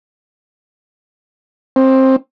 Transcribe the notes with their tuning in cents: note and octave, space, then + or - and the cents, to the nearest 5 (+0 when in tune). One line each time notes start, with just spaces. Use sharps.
C4 +15